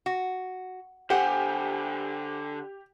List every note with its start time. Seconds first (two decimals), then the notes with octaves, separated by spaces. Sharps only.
0.06 F#4
1.10 D3 G4 C5 F#5 G#5